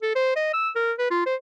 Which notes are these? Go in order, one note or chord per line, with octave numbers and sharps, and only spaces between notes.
A4
C5
D#5
E6
A#4
B4
F4
C5